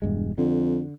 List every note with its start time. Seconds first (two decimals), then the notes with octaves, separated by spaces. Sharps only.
0.02 E1 G2 G#3
0.38 F2 D3